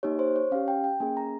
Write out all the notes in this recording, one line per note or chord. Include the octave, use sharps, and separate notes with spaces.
A#3 D#4 G4 C#5
C5
C#5
C#4 G4 F5
G5
G5
A#3 C#4 G#4 G#5
A#5